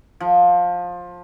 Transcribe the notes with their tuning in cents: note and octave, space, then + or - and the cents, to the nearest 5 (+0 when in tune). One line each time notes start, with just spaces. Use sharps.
F3 +20